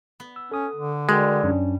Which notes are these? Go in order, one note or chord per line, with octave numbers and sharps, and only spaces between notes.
B3
E6
C#4 A4 D#6
D3
G3 G#3 F#4 A#4 D5 G5
F#2 C#4 D4